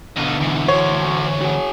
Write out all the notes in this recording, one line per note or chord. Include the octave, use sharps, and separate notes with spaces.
B2 D3 F4 D#5
D2 E3
F#4 C5 C#5
F#4 G#4